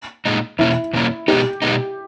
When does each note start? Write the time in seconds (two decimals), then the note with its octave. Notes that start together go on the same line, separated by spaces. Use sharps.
0.25 A#2 G#3 D#4
0.59 E2 B2 A#3 C#4 E4
0.93 E2 B2 A#3 C#4
1.28 B2 G#3 B3 D#4 G4
1.62 B2 G#3 B3 D#4